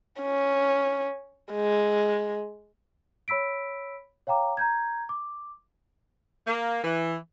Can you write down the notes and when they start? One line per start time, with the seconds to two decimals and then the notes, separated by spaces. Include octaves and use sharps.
0.22 C#4
1.52 G#3
3.28 C#5 B5 E6 B6 D7
4.27 C#5 F5 G5 A#5 D6
4.57 A#5 G6 G#6
5.09 D6
6.47 A#3
6.84 E3